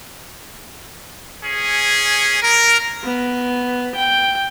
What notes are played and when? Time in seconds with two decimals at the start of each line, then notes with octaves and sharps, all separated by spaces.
1.44 C#4 G#4
2.42 A#4
3.04 B3
3.96 G5